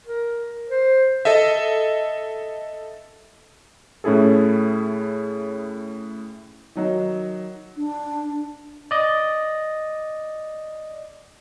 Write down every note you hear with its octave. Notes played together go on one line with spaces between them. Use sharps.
A#4
C5
A4 D#5 E5
A2 C#4 E4 G#4 A4
D#3 F#3 D#4
D4
D5 D#5